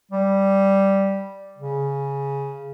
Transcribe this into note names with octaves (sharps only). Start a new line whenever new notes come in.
G3
C#3